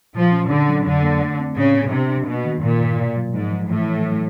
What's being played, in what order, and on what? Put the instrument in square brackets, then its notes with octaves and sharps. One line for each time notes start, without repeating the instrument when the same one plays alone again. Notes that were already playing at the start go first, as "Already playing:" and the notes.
[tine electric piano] A#2 [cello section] F3
[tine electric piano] C#4
[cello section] D3 [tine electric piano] D4
[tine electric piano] F#3
[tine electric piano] F2 [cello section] D3
[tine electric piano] A#3
A3
C4
[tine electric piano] A2 [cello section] C#3
[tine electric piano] B3
[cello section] C3 [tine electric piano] D4
[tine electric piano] D4
[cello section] B2 [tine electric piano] A#3
[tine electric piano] D#3
[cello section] A#2 [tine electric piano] D#3
[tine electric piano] G2
B2
F#3
[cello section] G#2 [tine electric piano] F3
[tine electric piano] F3
[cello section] A2 [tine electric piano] E3
[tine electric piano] E3
F#3